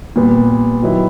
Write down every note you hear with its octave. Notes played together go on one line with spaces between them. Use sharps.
A#2 G3 B3
D#3 F#3 B3 E4